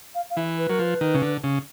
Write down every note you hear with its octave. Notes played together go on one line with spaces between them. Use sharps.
F5
F5
E3 E5
B4
F#3 A#4
F3 B4
D#3
C#3
D3
C#3